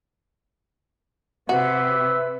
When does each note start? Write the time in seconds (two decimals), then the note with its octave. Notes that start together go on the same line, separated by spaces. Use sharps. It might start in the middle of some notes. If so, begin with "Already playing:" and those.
1.49 C3 F#4 B4 E5